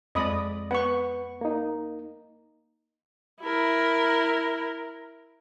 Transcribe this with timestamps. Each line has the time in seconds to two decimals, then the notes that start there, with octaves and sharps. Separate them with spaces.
0.15 F2 G#3 D5 D#5 B5 D#6
0.71 B3 B4 F#5 C#6
1.41 A#3 D#4
3.41 E4 A#4